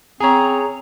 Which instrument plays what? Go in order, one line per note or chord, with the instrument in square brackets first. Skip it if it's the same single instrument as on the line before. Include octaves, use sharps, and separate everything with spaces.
[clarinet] C4 [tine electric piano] G#4 C#5 [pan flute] A#5